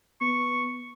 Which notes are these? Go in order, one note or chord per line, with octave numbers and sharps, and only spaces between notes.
B3 C#6